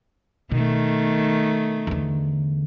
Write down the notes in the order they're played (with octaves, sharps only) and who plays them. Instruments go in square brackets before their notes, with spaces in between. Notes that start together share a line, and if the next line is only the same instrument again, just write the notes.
[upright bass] B2 [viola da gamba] D#3 A3
[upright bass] E2 D3